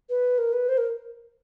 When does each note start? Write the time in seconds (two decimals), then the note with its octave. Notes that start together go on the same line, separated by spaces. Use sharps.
0.09 B4
0.38 A#4
0.52 B4
0.68 C5
0.77 A#4